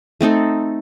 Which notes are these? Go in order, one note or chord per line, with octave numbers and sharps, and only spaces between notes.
A3 C4 D#4 A4